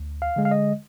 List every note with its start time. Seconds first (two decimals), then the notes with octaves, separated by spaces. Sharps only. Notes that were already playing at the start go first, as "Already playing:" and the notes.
Already playing: D2
0.22 F5
0.36 D3 G#3
0.45 F5
0.51 D#5